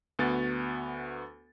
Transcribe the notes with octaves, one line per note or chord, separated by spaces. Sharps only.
D2 B3 F#4 A6